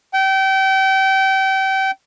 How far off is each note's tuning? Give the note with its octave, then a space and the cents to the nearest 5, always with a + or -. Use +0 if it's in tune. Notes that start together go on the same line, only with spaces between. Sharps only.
G5 -30